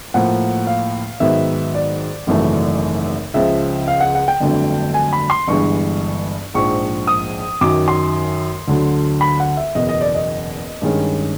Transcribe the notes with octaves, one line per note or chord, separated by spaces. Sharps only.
A2 F3 A#3 F#5
F5
G#2 D#3 F#3 B3 E5
D5
G#1 F#2 C#3 E3 A3
C#2 C#3 F3 E5
F5
F#5
F#5
G5
G1 F2 D3 F#3 A3
G#5
B5
C6
G1 G2 E3 G#3 C#6
A#1 G#2 F3 C#6
D#6
F#2 D#3 F#3 D6
C6
D2 D3 F#3
B5
F#5
E5
F#1 E2 B2 D#5
D#5
D5
D#5
G2 D#3 G#3 C#4